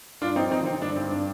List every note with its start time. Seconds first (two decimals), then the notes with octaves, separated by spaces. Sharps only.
0.21 G2 D4 F4
0.36 C4 D#4
0.41 F3
0.51 C4 D#4
0.61 D3
0.66 C4
0.82 G2 D4
0.96 C4
1.01 G2
1.11 D4